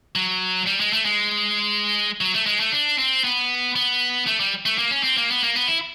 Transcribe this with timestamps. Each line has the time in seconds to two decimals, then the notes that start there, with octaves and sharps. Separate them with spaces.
0.16 F#3
0.66 G3
0.80 G#3
0.93 A3
1.05 G#3
2.21 F#3
2.34 A3
2.46 G#3
2.60 A3
2.72 D4
2.99 C4
3.24 B3
3.76 B3
4.27 A3
4.40 G3
4.66 A3
4.78 A#3
4.91 C#4
5.03 C4
5.17 A#3
5.30 B3
5.43 A#3
5.55 B3
5.68 E4